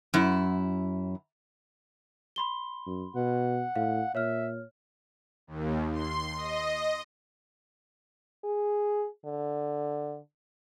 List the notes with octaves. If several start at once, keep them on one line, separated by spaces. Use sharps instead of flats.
F#2 E4
B5 C6 G7
F#2
B2 F#5
A2 F5
A#2 C#5 E5 F6
D#2
C6
D#5
G#4
D3